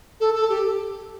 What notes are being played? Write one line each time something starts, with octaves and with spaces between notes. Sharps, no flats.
A4
A4
G4